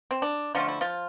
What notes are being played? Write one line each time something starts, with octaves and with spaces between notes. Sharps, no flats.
C4
D4
D3 F3 A3 F4
E4
F3 F4